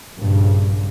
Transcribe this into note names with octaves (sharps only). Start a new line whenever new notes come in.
A#1 G2 C#3